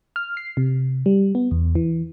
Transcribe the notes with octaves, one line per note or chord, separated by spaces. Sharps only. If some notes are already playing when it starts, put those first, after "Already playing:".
F6
C7
C3
G3
B3
E2
E3